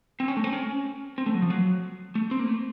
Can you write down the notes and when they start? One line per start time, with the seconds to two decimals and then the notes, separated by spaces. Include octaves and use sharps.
0.20 C4
0.28 C#4
0.37 A3
0.44 C4
0.53 C#4
1.18 C4
1.26 A3
1.34 F#3
1.42 F3
1.50 F#3
2.15 A3
2.31 C4
2.40 A#3
2.47 A3